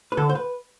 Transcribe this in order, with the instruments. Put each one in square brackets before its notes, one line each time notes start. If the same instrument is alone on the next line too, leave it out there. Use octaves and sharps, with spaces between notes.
[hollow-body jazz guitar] B4
[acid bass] D3 [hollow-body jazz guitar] A4
[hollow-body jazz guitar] C5
B4